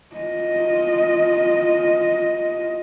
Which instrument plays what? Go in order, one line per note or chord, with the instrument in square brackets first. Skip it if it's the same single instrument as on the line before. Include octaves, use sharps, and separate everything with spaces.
[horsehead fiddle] F4 D#5